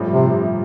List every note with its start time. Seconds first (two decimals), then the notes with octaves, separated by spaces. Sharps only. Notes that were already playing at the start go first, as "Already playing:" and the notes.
Already playing: A1 G2 F3 A3
0.13 C3